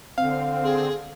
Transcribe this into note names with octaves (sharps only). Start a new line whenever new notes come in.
D3 C4 F5
G#4